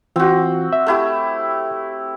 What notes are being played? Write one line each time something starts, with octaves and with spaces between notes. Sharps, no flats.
E3 C4 F4 F#4
E5
A3 E4 G4